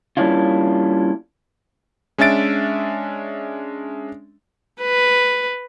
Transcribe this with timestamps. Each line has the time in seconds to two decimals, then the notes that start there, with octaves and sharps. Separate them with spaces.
0.17 G3 A#3 C#4 D4 E4 F4
2.18 G#3 C#4 D4 E5 A6 D7
4.81 B4